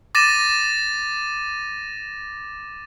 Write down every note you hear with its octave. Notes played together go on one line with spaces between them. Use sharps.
D6 A6 A#6 D#7 E7